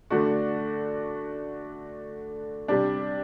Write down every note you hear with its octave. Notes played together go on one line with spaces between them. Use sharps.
D3 A3 D4 F#4
C3 G3 D4